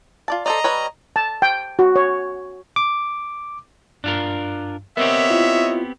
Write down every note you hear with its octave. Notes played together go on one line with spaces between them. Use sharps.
F4 D5 A5
A4 C5 D5 D#5 A#5
G3 B4 C#5
A5
G5
F#4
C#5
D6
G2 D4 F4 A#4
B3 C4 G4 A#4 C#5 D#5 E5
E4 F4